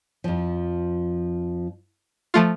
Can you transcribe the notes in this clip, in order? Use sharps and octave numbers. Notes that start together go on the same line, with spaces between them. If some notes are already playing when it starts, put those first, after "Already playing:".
F2 F3
F3 A3 F4